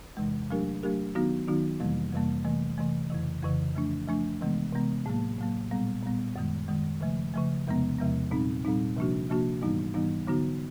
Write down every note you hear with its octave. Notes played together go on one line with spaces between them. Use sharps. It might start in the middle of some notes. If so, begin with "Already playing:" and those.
E2 C3 E3 G#3
F#3 A3 D4 G4 A#4
F#3 A3 D4 G4 A#4
D#3 F#3 B3 D#4 F#4
D#3 F#3 B3 D#4 F#4
F2 C3 E3 G3 A#3
F2 C3 E3 G3 A#3
C3 E3 A3
C3 E3 A3
F2 C#3 E3
F2 C#3 E3
F3 A3 D4
F3 A3 D4
C3 E3 G#3 B3
C3 E3 G#3 B3
A2 F#3 A#3
A2 F#3 A#3
A#2 G3 B3
A#2 G3 B3
F#2 D#3 G#3
F#2 D#3 G#3
C#3 F3 A3
C#3 F3 A3
E2 C3 F3 G#3 B3
E2 C3 F3 G#3 B3
A#2 G3 C4 D#4
A#2 G3 C4 D#4
C3 F3 A#3 D4 F#4
C3 F3 A#3 D4 F#4
G#2 E3 G3 B3 D#4
G#2 E3 G3 B3 D#4
D3 F#3 B3 D#4 F#4